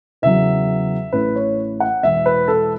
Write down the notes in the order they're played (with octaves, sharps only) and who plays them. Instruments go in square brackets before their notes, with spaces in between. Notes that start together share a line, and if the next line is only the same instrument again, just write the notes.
[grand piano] E2 C#3 F#3 E5
A1 A2 A3 C#4 B4
C#5
F#5
E1 E2 E3 E5
B4
A4